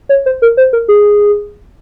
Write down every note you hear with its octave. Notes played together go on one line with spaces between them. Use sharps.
C#5
C5
A#4
C5
A#4
G#4